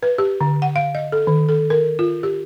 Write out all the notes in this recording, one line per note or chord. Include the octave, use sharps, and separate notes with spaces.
B4
G4
D3
F#5
F5
D#5
A4
D#3
A4
A#4
F4
G4